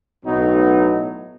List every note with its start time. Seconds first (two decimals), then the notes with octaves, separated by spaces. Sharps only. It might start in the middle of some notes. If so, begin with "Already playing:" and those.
0.23 B1 A2 F#3 B3 D#4